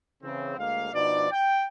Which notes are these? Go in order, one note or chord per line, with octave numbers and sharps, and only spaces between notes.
C#3 E3 C4
D2 G#3 A#3 F5
B2 F3 D4 D#4 D5
G5